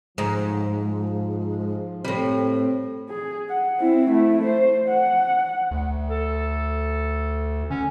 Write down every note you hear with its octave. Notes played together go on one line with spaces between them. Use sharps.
G#2 F3
A2 G3 C4
G#4
F#5
C4 E4
A3 E4
C5
F#5
D2
A4
D3 C#4